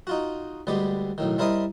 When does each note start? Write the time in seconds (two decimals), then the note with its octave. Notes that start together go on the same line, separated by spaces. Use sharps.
0.07 D#4 F4 F#4
0.67 D2 G3 G#3 B3 G4
1.18 B1 A2 D#3
1.38 G3 E4 A#4 C5 D#5 D#6